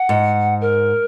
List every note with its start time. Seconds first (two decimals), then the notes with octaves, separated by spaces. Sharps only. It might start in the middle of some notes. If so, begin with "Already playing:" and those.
Already playing: F#5
0.09 G#2
0.61 A#4